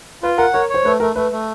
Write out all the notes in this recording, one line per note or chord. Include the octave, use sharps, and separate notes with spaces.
F4 B4
A#4 F#5
A#4 C#5
C#5
C5
A3 B4
A3 A#4
A3 B4
A3